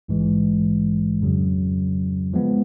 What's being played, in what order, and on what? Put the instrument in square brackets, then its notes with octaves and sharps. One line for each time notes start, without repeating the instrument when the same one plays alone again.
[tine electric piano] A#1 G#2 E3 G#3
F2 C#3 F#3
F3 G#3 B3